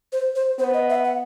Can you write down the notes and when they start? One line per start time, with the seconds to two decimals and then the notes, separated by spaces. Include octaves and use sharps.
0.12 C5
0.35 C5
0.59 B3 C5
0.74 D#5
0.90 E5
1.04 F#5